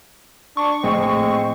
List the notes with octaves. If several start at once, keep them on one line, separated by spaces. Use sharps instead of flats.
D4 C#6
A#1 A2 G#3 A3 C4